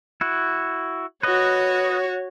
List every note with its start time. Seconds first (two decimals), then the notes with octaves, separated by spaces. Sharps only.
0.21 E4 F#4
1.23 F#4 B4 C#5 D#5